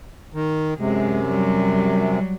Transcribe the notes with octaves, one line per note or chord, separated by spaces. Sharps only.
D#3
F#2 C3 G#3
F#3 G3